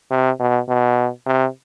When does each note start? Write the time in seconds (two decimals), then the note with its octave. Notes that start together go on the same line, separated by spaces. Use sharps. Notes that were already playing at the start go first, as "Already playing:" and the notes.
0.11 C3
0.40 B2
0.69 B2
1.26 C3